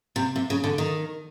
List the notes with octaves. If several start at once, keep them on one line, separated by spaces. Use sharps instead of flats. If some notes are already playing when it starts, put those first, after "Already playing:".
C3
C3
C#3
D3
D#3